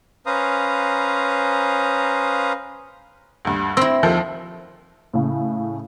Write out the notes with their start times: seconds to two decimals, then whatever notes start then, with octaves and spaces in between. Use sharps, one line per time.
0.26 C#4 B4 C5 F5 A#5 D#6
3.45 D2 G2
3.77 C4 E4 C6 E6 A#6
4.03 D#2 F3 A4
5.14 A2 C#3